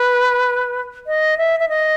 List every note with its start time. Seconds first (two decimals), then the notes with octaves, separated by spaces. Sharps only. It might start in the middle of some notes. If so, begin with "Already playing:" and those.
Already playing: B4
1.07 D#5
1.38 E5
1.60 E5
1.69 D#5